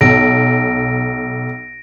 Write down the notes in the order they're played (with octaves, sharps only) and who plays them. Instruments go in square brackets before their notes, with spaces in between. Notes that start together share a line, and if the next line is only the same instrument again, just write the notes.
[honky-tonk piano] B1 [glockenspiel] A#6 D7